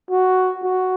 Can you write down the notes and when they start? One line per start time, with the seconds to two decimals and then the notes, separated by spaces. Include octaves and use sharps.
0.11 F#4
0.62 F#4